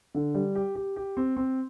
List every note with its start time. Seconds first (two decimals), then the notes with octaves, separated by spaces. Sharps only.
0.15 D3
0.35 G3
0.55 G4
0.75 G4
0.96 G4
1.17 C4
1.37 C4